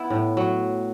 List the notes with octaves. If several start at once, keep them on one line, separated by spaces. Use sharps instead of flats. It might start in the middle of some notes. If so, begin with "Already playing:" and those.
Already playing: B3 E4
A2
F#3